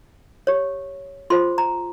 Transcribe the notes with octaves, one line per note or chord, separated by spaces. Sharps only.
G4 C#5
F4 G#4 C5 C6
A#5